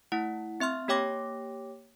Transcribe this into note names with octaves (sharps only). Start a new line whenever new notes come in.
A3 E4 F#5
C4 E5 C6 F6
A#3 G4 C#5 G5 D6 A#6